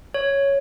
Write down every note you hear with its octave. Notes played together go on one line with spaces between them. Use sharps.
C#5